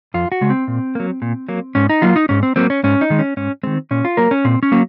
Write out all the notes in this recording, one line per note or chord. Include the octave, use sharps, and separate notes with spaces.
F2 F4
F#4
C#3 G#3
C4
A#2
F#3 A#3
A#2
F#3 A#3
G#2 C#4
D#4
F#3 A#3 F4
D#4
G#2 C#4
C4
F#3 A#3 C4
C#4
G#2 C#4
D#4
D#3 G#3
C#4
G#2 C#4
D#3 G#3 C4
A#2 C#4
F4
F#3 A#3 A#4
C#4
A#2 C4
C#4
F#3 A#3